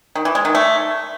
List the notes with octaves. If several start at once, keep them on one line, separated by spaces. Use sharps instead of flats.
D#3
E3
G#3
D#3
A3